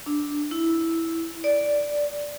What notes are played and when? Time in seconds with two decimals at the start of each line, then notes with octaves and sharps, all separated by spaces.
0.06 D4
0.51 E4
1.44 D5